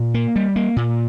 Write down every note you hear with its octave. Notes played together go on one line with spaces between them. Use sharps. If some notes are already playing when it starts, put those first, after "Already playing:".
Already playing: A#2
A#3
G3
A#3
A#2